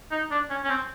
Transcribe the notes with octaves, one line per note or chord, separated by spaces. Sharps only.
D#4
D4
C#4
C#4
C4